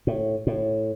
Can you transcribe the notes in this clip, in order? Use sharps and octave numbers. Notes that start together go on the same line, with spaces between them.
A2
A2